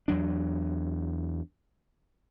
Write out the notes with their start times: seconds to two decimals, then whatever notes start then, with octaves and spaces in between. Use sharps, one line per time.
0.08 E2 F#3 D4